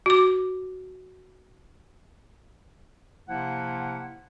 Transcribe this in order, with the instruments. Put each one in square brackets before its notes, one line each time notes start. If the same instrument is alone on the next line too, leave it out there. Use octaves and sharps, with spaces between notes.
[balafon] F#4 D6
[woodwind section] C3 F3 A#3 E4 F#5